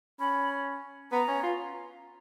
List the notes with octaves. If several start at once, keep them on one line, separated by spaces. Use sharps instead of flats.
C#4 B5
B3 A#5
C#4
F4